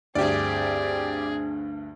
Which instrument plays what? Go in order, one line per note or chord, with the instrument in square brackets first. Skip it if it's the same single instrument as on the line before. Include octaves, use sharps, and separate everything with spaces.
[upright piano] D2 G2 [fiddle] C4 G#4 [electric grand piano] G4 D5